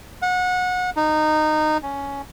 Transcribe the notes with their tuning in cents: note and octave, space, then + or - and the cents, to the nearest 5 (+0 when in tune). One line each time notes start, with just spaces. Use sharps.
F#5 -25
D#4 -15
C#4 +10